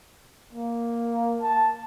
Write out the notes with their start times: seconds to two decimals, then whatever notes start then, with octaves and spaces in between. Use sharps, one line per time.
0.53 A#3
1.42 A5